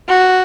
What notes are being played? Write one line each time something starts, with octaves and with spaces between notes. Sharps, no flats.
F#4